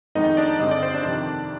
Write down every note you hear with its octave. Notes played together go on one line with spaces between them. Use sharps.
F2 D#3 G#3 B3 D#4 D#5
D4 D5
G2 D3 G#3 C4 D#5
D5
C5
D4 D5
F2 C3 D#3